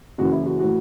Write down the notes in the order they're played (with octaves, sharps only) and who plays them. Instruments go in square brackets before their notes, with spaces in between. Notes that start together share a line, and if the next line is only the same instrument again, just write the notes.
[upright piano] F#1 F#2 E3 F#4
E4
F#4
A2 E3 F#4